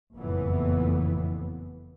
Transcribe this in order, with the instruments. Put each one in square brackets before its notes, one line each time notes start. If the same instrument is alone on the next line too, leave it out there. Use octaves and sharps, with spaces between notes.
[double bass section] F#1 F2 A2 E3 B3